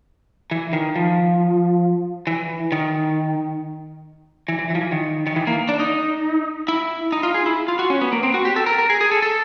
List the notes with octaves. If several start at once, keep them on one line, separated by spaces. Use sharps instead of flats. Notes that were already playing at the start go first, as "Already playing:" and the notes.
E3
D#3
F3
E3
D#3
E3
E3
E3
F3
E3
D#3
D#3
E3
A#3
D4
D#4
E4
D#4
F4
G#4
E4
F4
F#4
C#4
B3
A#3
C4
F#4
G4
A4
A#4
A#4
G#4
G#4
A4
A4